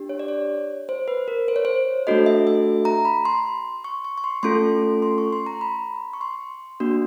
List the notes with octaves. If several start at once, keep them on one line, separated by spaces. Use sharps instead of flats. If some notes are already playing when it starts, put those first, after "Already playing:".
Already playing: D4 G4
C#5
D5
C#5
C5
B4
A#4
C5
C#5
C5
A3 D4 F#4 A4 D#5
E5
E5
A#5
B5
C6
C#6
C#6
C#6
C6
A3 C#4 F4 A4 C6
C6
C#6
C6
A#5
B5
C#6
C6
A#3 D4 F#4